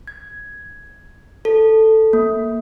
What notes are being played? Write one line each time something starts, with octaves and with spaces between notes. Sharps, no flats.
G#6
A4
A#3